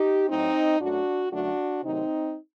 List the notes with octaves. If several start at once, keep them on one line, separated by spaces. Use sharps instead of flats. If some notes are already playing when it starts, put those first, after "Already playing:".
Already playing: D#4 G4
A2 F#3 A3 C4 D#4
F#2 F#3 A3 D4 F#4
F#2 D3 F#3 A3 D4 F#4
C3 D#3 F#3 A3 C4 D#4